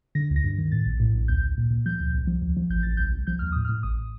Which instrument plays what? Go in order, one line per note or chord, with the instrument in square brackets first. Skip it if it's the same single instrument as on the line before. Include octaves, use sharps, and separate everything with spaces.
[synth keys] D3 A#6
D2
A#6
G2
D#3
A2 A6
A#1
A2
A#1
D2 G6
D2
A#2
A#2
F3 G6
D2
C2
F3
D2
F3
A1 G6
A1 A6
C2 G6
C2
F3 G6
D#2 F6
A2 D#6
F6
A2
A1 D#6